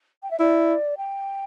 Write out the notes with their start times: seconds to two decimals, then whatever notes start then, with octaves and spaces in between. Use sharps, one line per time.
0.23 G5
0.31 E5
0.40 E4 D5
0.97 G5